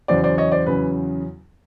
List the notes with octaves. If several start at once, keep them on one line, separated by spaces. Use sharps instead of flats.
E2 C#3 F#3 C5 D5
C5 D5
C#5 D#5
C5 D5
E2 C#3 F#3 B4